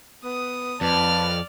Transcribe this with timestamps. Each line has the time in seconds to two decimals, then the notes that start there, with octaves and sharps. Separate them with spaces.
0.24 B3 D#6
0.81 F2 B4 D5 A5 F6